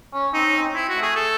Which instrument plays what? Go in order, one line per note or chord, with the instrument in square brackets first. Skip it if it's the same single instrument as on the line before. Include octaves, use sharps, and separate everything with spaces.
[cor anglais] C#4
[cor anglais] C4 [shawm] D#4
[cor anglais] C#4
C4
[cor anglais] C4 [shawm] E4
[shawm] F#4
[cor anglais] A3
[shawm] G#4
A4